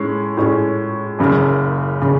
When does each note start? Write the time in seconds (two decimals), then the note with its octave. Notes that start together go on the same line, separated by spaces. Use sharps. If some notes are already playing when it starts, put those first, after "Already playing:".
Already playing: A2 G#3 C#4
0.37 A2 G#3 C#4
1.19 F#1 F#2 C#3
2.02 C#3